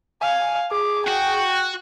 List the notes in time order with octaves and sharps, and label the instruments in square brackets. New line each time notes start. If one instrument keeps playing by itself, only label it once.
[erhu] F5 [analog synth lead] G#5
[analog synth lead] G#4 [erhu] D6
[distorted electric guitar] F#4 [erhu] G5